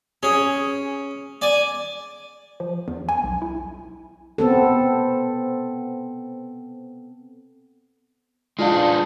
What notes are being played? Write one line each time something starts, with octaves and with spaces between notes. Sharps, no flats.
C#4 G#4
D5 G#5
F3
E2
G#5
B1
E4
B3 C4 A4
G#3 D4 F4 F5